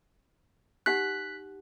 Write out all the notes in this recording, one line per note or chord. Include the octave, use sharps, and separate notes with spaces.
D#4 G4 F#5 F#6 B6